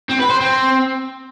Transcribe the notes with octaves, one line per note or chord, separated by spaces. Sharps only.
C4
B4
C5
C4